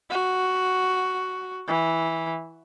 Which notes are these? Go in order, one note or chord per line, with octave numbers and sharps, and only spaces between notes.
F#4
E3